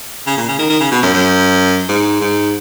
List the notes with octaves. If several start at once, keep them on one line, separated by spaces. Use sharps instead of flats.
C#3
A#2
C#3
D#3
D#3
C#3
B2
F#2
F#2
G#2
G#2